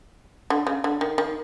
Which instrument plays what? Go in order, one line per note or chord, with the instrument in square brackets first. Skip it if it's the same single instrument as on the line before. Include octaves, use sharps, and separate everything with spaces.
[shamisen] D3
C#3
D3
D#3
D#3